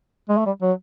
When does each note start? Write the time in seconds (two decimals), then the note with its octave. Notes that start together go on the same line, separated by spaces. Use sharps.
0.29 G#3
0.38 A3
0.46 G3
0.62 F#3